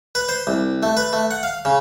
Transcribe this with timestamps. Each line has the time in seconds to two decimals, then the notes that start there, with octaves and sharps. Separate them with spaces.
0.15 B4
0.29 C5
0.47 C2
0.83 A3
0.97 B4
1.13 A3
1.31 F#5
1.43 F5
1.65 C#3